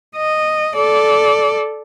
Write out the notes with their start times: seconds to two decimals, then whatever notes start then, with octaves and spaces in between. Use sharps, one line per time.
0.16 D#5
0.76 A4 D5